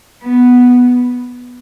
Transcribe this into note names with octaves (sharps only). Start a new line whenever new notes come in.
B3